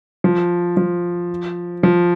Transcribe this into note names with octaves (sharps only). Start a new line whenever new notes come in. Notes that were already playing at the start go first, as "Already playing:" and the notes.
F3
F3
F3